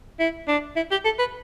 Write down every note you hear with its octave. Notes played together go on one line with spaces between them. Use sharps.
E4
D4
E4
G4
A4
B4